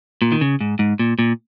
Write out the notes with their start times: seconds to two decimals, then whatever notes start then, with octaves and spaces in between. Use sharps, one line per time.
0.22 A#2
0.32 D#3
0.41 C#3
0.60 G#2
0.79 G#2
0.99 A#2
1.19 A#2